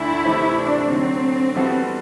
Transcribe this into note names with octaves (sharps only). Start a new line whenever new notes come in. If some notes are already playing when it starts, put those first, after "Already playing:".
Already playing: D2 D3 A3 D4 E4
C3 E3 A3 C4
D4
D3 F#3 A3 C4
E3 G3 B3 F#4 A4